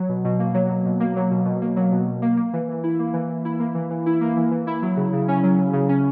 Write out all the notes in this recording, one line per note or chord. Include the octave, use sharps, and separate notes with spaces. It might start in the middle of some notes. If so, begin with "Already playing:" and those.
Already playing: F#3
B2
B2
A#3
F#3
B2
B2
A#3
F#3
B2
B2
A#3
F#3
B2
B2
A#3
A#3
E3
E3
E4
A#3
E3
E3
E4
A#3
E3
E3
E4
A#3
E3
E3
E4
F#3
C#3
C#3
C#4
F#3
C#3
C#3
C#4